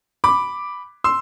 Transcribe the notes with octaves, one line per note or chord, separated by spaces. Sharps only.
B5 D6
C6 E6